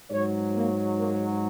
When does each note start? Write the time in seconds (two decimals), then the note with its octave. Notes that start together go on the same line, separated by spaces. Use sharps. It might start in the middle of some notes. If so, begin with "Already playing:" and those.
0.11 G#2 F#3 C#5
0.54 A#3
0.97 A#3